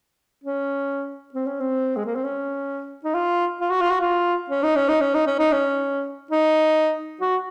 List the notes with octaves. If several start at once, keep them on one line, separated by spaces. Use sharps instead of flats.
C#4
C4
C#4
C4
G#3
A#3
C4
C#4
D#4
F4
F4
F#4
F4
F#4
F4
C#4
D#4
C#4
D#4
C#4
D#4
C#4
D#4
C#4
D#4
F#4